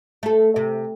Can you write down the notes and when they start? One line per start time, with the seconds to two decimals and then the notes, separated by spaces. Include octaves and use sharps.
0.23 A3 A4
0.56 C3